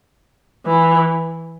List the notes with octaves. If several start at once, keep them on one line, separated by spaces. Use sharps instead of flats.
E3